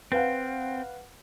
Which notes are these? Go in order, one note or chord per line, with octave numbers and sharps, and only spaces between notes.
C4 B4 F5 F#5